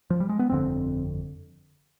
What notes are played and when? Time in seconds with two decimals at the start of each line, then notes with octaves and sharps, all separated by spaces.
0.10 F3
0.20 G3
0.29 G#3
0.39 B3
0.50 G1 F2 D3 C4